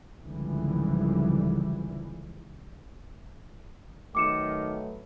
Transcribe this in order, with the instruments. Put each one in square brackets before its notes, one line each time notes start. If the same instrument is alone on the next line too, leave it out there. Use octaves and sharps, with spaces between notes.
[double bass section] G#1 C#2 D3 E3 F3 G3
[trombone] D#3 [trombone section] F#3 A3 B4 [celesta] D6 C#7 E7